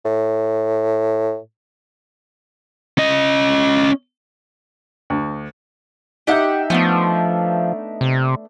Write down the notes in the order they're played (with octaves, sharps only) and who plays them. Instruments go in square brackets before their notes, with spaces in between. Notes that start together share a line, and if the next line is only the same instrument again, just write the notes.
[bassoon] A2
[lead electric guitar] C#4 D#5
[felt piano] D2
[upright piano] D#4 E5 G6 [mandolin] G4 F#5
[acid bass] F3 [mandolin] A3 B3 D4
[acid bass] C3